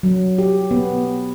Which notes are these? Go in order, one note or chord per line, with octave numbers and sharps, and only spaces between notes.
F#3
G4
B3